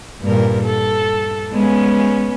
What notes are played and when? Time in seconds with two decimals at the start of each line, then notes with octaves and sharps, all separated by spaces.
0.22 G2 A#2 A#4
0.64 A4
1.52 G#3 B3 C#4